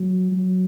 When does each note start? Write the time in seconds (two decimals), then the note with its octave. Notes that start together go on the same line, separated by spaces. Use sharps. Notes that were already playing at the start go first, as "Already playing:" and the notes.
Already playing: F#3
0.32 F#3